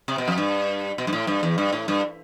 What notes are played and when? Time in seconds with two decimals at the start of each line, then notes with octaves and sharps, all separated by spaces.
0.08 C3
0.18 B2
0.28 F2
0.38 G2
0.98 B2
1.07 G2
1.13 A2
1.27 G2
1.43 E2
1.58 G2
1.73 A2
1.88 G2